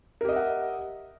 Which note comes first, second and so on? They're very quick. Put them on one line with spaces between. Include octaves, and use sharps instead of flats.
A#4 G4 D#5 E5 F#5